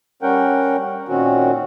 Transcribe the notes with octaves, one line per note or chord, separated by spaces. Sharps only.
G3 C#4 A#4 F#5 G5
A#2 D#3 C4 C#4 F#4